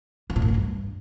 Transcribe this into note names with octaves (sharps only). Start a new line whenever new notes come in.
G2
A2
F#2
C#3
G2